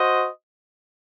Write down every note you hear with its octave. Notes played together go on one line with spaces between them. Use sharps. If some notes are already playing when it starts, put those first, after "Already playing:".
Already playing: F#4 C5 D#5